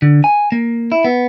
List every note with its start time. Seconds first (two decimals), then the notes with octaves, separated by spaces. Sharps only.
0.02 D3
0.24 G#5
0.52 A#3
0.92 E4
1.05 B3